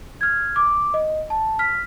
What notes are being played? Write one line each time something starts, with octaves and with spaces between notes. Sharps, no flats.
F6 G#6
D6
D#5
A5
F6 B6